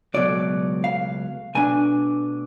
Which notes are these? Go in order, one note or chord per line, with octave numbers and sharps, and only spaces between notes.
C#2 B2 F#3 A3 D5
F5
B2 A3 D4 G#5